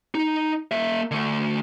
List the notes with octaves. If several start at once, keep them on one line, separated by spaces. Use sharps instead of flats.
D#4
A#3 E5
D3 A3